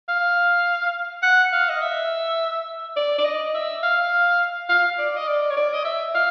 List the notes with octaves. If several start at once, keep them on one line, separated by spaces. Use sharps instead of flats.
F5
F#5
F5
D#5
E5
D5
D5
D#5
E5
F5
F5
D5
D#5
D5
C#5
D5
D#5
E5
F5